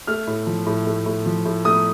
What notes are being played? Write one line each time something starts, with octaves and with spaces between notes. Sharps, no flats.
A3 F6
A2
F3
A2
A3
A2
F3
A2
A3 D#6